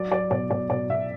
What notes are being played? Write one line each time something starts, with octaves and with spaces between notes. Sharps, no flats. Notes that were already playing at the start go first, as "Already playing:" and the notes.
Already playing: F#3 D5
F#3 D5
B2 D5
B2 D5
B2 D5
B2 E5